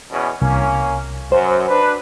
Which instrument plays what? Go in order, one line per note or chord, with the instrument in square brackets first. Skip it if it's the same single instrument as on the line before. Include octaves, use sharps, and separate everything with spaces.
[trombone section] E2 B2 C#4
[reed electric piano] C2 [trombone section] A#3 C#4
[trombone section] F#2 [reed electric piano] C5
[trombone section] D4 B4